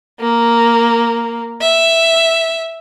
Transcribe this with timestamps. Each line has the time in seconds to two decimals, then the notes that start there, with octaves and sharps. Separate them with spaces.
0.20 A#3
1.61 E5